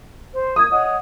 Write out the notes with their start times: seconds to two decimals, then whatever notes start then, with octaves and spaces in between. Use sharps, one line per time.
0.33 C5
0.56 D#6 G#6
0.71 C#5 D#5 F#5